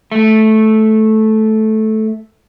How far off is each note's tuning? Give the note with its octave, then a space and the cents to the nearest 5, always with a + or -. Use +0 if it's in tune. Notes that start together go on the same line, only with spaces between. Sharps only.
A3 -10